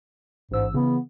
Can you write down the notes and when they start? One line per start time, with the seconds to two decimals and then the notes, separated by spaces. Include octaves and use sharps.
0.51 A1 G#2 E6
0.74 C#3 E3 B3